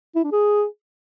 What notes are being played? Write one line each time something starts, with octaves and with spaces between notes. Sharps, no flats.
E4
D4
G#4